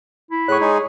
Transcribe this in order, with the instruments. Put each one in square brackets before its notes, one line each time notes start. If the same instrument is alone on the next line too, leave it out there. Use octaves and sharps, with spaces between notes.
[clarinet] E4
[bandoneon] A2 F#6 [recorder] G#4 [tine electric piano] C#5 C#6
[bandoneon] G#3 D#4